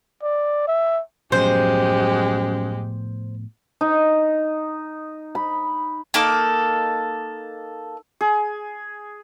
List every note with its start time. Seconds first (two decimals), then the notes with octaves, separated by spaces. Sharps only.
0.23 D5
0.67 E5
1.32 F#2 A2 F3 G#3 B3 G4 C5
3.81 D#4
5.35 B5
6.14 A#3 D#4 A4 D6
8.21 G#4